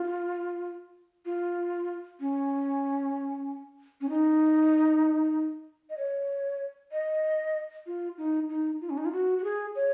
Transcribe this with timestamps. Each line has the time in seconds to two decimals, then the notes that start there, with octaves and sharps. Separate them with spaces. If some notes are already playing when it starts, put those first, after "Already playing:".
Already playing: F4
1.26 F4
2.20 C#4
4.01 C#4
4.09 D#4
5.90 D#5
5.98 C#5
6.92 D#5
7.87 F4
8.18 D#4
8.49 D#4
8.81 F4
8.90 C#4
8.98 D#4
9.05 F4
9.12 F#4
9.38 F#4
9.44 G#4
9.76 C#5